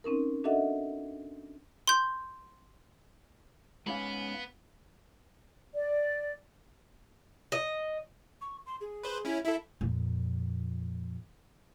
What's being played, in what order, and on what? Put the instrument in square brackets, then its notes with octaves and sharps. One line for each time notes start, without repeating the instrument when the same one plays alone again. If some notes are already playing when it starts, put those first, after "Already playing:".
[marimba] C4 C#4 D#4 A#4
D4 F#4 A4 D#5 E5 F#5
[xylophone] C6 G6
[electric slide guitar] G#2 C#4 F5 [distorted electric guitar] B3 B5
[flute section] D5
[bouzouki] D#5
[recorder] C#6
C6
G#4
[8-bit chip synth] B4 C5
C#4 E4
[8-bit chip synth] E4 A4 [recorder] E5
[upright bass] F2 A#2